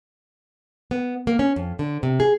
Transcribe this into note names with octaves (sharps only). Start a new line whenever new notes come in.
B3
A#3
C#4
F2
D3
C3
G#4